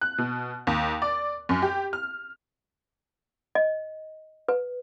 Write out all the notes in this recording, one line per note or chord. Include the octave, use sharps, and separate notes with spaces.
F#6
B2
D#2
D5
F#2
G4
F6
D#5
B4